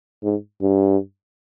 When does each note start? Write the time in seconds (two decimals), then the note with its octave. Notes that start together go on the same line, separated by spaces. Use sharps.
0.23 G#2
0.62 G2